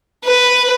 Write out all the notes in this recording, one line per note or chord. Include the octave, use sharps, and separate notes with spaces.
B4